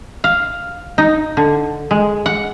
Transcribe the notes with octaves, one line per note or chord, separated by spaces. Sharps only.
F5
D#4
D3
G#3
F#5